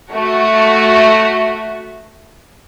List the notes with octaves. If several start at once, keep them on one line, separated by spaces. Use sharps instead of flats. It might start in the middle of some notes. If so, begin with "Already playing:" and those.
A3 F#4